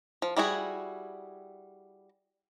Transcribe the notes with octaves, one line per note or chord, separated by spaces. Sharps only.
F3
G3 E4 F#4 G#4